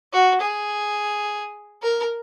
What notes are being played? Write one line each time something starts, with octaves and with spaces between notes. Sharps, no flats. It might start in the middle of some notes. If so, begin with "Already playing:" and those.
F#4
G#4
A#4